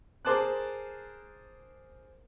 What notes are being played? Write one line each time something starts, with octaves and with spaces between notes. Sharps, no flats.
G#4 A#4 C5 A5 D6 F#6